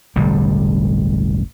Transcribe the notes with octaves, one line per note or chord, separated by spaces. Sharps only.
E1 A1 D3 G3